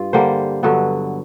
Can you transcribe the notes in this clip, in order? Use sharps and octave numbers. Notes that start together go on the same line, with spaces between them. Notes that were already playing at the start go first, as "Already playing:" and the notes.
Already playing: G2 F4
D3 G3 A#3 C5
G2 D3 F#3 B3